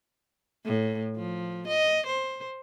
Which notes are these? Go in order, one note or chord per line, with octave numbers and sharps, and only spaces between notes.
A2
F3
D#5
C5